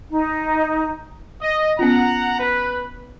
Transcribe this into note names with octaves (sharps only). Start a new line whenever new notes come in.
D#4
D#5
B3 C#4 F4 F#5 A#5
B4